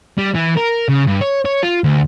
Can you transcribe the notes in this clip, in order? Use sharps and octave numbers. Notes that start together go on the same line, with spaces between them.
G3
E3
A#4
C#3
G2
C#5
C#5
F4
D2